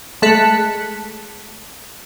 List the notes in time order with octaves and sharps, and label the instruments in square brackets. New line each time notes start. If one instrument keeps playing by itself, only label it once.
[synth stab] G#3 A3 A5 F#6 B6 C#7